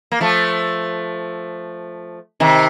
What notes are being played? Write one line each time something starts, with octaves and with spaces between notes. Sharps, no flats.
A#3
F3 A3
C3 D#3